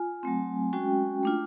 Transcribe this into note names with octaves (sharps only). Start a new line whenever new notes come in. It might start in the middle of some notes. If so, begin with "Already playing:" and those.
Already playing: F4 G#5
F#3 A3 C4
G#3 C#4 F#4 G5
A3 D4 F4